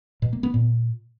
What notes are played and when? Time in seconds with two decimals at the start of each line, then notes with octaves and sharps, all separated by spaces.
0.22 B2
0.33 A#3
0.43 B3
0.54 A#2